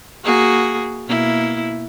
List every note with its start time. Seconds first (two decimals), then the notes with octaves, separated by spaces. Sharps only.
0.24 A#3 F#4 G#4
1.07 B2 A#3 E4